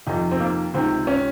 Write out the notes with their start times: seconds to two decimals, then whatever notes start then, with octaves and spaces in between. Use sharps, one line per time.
0.07 F2 C3 D#3 D#4
0.31 C4
0.40 A#3
0.74 C#2 C3 D#3 C4
1.07 C#4